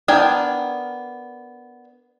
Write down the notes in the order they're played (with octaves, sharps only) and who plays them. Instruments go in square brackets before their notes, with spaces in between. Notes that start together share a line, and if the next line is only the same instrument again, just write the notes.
[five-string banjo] B3 D4 A#4 G5 G#5